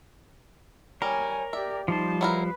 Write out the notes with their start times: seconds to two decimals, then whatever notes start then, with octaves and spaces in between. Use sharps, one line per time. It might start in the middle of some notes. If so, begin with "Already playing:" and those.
1.02 G3 A#4 C#5 G#5
1.53 G4 D5 E5
1.88 F3 G3 D#4 C5 A5
2.21 F#3 E4 A#4 B4